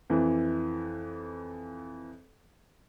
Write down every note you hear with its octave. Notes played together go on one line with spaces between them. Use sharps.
F2 E3